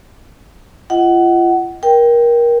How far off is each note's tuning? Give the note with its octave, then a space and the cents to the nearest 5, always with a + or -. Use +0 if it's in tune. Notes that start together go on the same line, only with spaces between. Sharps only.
F4 -30 D#5 +20 F#5 +20
A#4 +25 G5 +0